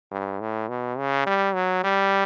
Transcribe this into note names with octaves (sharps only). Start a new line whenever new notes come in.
G2
A2
B2
C#3
G3
F#3
G3